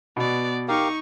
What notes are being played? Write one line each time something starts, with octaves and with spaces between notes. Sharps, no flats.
B2 B3 D5
D#4 G4 A#4 F5 C#6